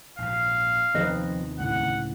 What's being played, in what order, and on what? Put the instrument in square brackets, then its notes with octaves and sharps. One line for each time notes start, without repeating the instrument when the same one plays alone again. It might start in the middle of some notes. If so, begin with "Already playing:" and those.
[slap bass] A#1 G#2 B2 [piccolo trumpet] F5
[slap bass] D#2 C3 B3 [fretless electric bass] F3 C4 [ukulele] D#4 B4 D#5
[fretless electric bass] C#2 A2 [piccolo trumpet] F#5